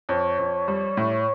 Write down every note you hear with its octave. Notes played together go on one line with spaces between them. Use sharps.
F2 C#5
F2
G3
A2